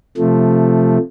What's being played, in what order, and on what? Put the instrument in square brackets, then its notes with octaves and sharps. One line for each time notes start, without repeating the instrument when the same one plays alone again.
[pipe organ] C3 F3 A3